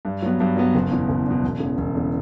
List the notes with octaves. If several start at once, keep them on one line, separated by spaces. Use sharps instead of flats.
G2
F#3 B3
G2
F#3 B3
F#1
E2 B2
F#1
E2 B2
E1
E2 C#3
E1
E2 C#3